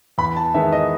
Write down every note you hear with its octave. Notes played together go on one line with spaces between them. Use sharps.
E2 B5
A5
D#3 G#3 B3 E5
D#5